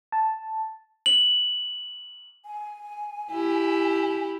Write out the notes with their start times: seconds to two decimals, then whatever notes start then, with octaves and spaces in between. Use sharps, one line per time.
0.12 A5
1.06 F#7
2.45 G#5
3.31 E4 G4